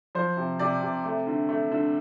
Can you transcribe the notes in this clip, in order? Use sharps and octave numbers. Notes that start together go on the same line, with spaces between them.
F3 C5
C3
C3 D5
C3
A3
D3
A3
D3